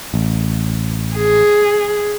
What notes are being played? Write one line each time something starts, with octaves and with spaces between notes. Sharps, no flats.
A1
G#4